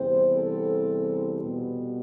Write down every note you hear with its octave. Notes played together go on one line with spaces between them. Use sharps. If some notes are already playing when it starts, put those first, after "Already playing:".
Already playing: E2 C3 G3 C4 C5
A4
B2 G3 B3